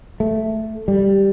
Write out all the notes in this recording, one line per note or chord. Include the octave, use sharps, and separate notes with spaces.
A3
G3